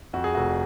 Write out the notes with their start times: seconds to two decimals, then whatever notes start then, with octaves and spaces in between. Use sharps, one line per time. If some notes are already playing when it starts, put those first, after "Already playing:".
0.13 F2 F#4
0.24 G#4
0.35 F1 F#4